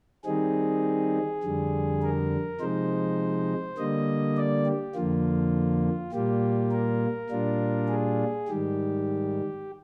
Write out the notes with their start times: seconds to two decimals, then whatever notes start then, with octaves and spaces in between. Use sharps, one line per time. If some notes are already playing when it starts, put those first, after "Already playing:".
0.25 D#3 G3 C4 D#4 G#4
1.43 F2 D3 G3
2.02 A#4
2.60 C3 F3 G#3 D#4 C5
3.78 D3 G3 A#3 D#5
4.37 D5
4.66 G4
4.95 F2 D3 F3 A#3 F4
6.13 A#2 G3 A#3 F4 G4
6.71 A#4
7.30 A#2 G3 D4 F4
7.89 G#4
8.48 G#2 D#3 G3 G4